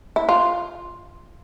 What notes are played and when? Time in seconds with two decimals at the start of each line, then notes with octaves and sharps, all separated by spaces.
0.16 E4
0.29 F4